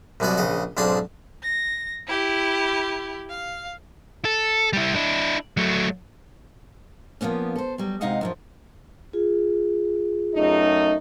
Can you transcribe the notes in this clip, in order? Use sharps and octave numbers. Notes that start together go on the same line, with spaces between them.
C2 F#2 B2 F#4 D5 D#5
A#1 C#3 D#5 F#5
B1 G#2 C4 D4 A5 D#6
A#6
E4 G4
F5
A4
G3 E4
D4 E4
F#3 A3
F3 F#3 A#3 B3 C#4
A4 C5
F#3 G3
C3 G#3 D#4 D#5 F5 F#5
F#2 E3 F3
F4 G#4
F#2 A3 D#4